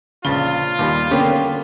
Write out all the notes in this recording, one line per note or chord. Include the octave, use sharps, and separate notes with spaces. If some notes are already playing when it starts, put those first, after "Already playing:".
A#1 C#3 F4 A6 G7
D#2 G3 B5
D3 A#3 B3 C#4 G5